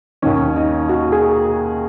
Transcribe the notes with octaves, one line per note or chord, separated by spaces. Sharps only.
D#2 D#3 C#4
D#4
F#4
G#4